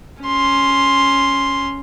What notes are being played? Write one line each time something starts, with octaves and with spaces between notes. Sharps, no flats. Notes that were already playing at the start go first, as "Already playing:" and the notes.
C#4 C6